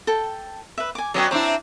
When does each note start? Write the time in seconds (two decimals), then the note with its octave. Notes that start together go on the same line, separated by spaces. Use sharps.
0.07 A4 G5
0.78 B4 E5
0.95 G#5 D6
1.14 F#3 B3 C#4 D5 D#5 G5
1.31 C4 D4 E4 A#5 D6